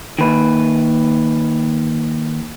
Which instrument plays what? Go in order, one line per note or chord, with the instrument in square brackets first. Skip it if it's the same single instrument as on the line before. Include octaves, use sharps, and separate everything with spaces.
[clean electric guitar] D#3 A#3 B4